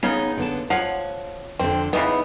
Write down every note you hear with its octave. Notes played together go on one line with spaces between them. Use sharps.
C#3 B3 D#4 C#5
D3 B3 A5
F3 C#5 F#5
F2 D3 C4
C#3 E3 B3 D#4